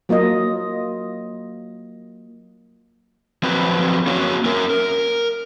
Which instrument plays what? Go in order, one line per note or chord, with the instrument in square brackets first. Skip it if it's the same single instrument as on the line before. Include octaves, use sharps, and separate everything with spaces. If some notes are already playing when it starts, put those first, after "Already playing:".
[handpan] F#3 A#3 F4 D#5
[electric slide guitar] F3 F#3 C4 B4
A#3 C#4 F#4 C#5
C#4 A#4
A#4